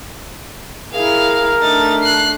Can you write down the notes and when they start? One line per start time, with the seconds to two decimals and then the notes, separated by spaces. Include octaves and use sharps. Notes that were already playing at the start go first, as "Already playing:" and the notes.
0.94 E4 G#4 A#4 F5
1.61 A3 D4 D#4 A6
2.02 F#6 C7